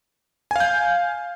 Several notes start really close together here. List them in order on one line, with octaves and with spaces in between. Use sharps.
G#5 F5 G6